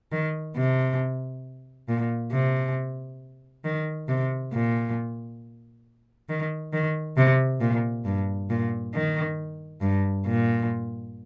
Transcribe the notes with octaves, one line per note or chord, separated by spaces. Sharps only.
D#3
C3
A#2
C3
D#3
C3
A#2
D#3
D#3
C3
A#2
G2
A#2
D#3
G2
A#2